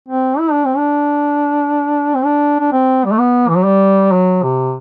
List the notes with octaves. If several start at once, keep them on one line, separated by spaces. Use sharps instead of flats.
C4
E4
D4
C4
D4
C4
D4
D4
C4
G3
A3
B3
E3
F#3
G3
F#3
C3